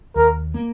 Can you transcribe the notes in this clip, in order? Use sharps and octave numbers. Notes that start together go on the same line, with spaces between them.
D#2 A#4
A#3